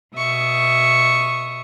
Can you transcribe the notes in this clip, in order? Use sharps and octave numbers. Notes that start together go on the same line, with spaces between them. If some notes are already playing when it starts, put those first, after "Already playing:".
B2 E5 C#6 D#6